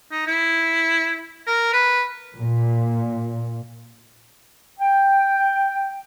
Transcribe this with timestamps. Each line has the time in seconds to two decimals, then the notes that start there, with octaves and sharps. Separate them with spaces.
0.11 D#4
0.27 E4
1.47 A#4
1.73 B4
2.36 A#2
4.79 G5